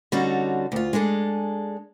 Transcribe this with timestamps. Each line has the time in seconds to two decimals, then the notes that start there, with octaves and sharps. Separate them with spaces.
0.12 D3 G3 C#4 D#4 F#4 A4
0.72 D2 F4
0.93 G#3 D4 G#4 A4